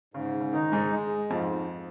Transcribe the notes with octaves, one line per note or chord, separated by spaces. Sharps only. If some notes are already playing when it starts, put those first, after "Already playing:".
G#2 C#3
C#3
D#3 D#4
G#2 G#3
G#3
F2 G#2 F3